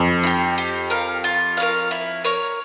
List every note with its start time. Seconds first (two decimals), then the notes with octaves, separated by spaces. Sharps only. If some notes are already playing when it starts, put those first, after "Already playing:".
Already playing: F2
0.24 E4
0.27 G4
0.58 G4
0.90 A#4 F5
1.24 F4
1.57 A#4 C#5 F5
1.91 E4
2.24 A#4 C#5